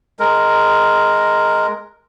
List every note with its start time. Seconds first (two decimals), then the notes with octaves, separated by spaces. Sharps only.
0.19 G#3 A#4